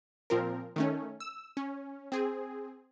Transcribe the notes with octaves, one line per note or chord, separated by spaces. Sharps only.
A#2 F3 C4 A#4
D#3 A3 C#4
E6
C#4
C4 G#4